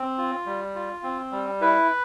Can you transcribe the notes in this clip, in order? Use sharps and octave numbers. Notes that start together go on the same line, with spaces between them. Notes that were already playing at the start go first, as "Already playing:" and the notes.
Already playing: C4
F4
G3
F4
C4
G3
E4 B4